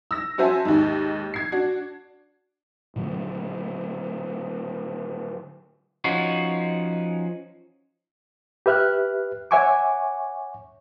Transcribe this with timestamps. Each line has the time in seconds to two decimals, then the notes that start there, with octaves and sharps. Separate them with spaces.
0.11 E6 A#6
0.38 C#4 F#4 C5 E5 G#5 A5
0.65 D#2 G#2
1.34 G#6 C7
1.52 D4 F#4
2.96 A#2 D3 F#3 A3
6.04 F3 C#4 D#4 F4 F#4
8.66 G4 B4 E5 F6 F#6
9.51 C#5 E5 F#5 G#5 C#6 D6